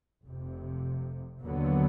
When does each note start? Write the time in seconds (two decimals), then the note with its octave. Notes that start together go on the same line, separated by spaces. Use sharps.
0.25 F1 F2 C3
1.42 D#2 D3 F#3 B3